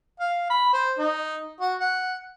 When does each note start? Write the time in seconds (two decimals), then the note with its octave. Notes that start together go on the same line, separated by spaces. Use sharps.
0.20 F5
0.50 B5
0.73 C5
0.99 D#4
1.60 F#4
1.80 F#5